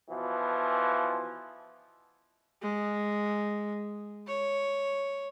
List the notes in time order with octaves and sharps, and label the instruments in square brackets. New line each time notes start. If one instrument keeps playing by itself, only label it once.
[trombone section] B2 E3 F3
[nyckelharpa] G#3
C#5